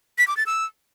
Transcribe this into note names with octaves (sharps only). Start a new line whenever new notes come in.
B6
D6
A6
E6